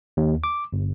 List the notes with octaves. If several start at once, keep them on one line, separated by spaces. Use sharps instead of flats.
D#2
D6
G1